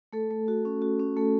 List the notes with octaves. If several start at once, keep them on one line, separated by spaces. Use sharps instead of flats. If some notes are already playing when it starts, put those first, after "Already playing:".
A3 A4
A3
F#4
C#4
F#4
C#4
A3 A4